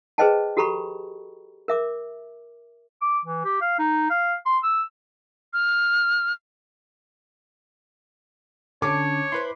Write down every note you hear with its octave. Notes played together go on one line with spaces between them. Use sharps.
G#4 B4 C5 D#5 G5 A5
F#4 G4 A4 A#5 B5 C#6
A#4 E5 D6
D6
E3
G4
F5
D#4
F5
C6
E6
F6
D3 C#4 C#5 A5 D6
E4 B4 C5 B5 C6